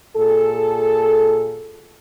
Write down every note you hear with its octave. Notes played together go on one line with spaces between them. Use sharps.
A#2 G#4 A4